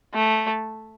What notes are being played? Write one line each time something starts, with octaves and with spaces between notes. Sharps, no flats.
A3